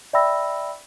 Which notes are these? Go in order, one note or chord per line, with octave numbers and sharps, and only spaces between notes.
D5 E5 G5 B5 E6 A#6